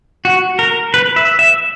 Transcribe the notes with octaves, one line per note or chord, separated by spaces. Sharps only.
F#4
A#4
B4
E5
E5